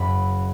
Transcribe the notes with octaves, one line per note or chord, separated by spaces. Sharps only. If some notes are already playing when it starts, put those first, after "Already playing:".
Already playing: F#1 F#2 B5